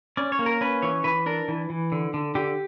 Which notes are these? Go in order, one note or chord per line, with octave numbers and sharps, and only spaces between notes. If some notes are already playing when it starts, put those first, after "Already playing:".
C#4 D5
C#5
A#3
A#4
C#4 B4
E3 C#5
E3 B4
D4 A#4
E3
E3
D3
D3
D3 G4